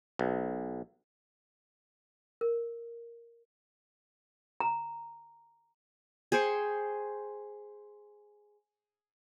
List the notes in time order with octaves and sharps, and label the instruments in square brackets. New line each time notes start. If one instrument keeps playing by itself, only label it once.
[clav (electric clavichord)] B1
[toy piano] A#4
A#5
[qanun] G#4 C5 G5 C#6